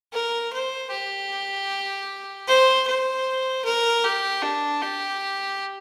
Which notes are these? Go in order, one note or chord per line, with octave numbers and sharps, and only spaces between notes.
A#4
C5
G4
C5
C5
A#4
G4
D4
G4